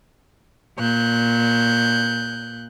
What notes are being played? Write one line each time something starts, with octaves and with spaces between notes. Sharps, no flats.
A#2 F#6 G6